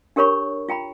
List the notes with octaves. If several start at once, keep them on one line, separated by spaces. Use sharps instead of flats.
D4 G4 A#4 C#5 B5 C#6
F4 G5 A#5 B5